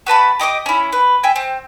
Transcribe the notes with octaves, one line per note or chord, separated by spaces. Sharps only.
F#4 B4 A5 B5
G4 D#5 C#6 D6
C#4 E4
B4
E5 G5 G#5
C4